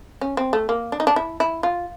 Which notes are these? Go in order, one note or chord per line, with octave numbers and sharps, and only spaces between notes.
C#4
C4
A3
A#3
D4
D#4
D4
E4
E4
F4